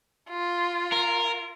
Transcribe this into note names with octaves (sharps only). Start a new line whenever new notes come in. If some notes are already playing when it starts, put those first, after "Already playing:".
F4
A#4